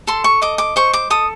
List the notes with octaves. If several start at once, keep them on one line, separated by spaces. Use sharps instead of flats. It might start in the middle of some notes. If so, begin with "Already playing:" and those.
A4 C6
C#6
D#5 D6
D6
C5 C#6
D6
A4 D#6